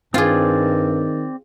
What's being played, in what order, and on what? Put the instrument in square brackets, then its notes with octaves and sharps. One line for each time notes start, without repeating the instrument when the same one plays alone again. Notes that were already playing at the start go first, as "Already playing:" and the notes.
[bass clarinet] G2 [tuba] D#3 [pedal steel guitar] C4 D5 [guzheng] F4 G#4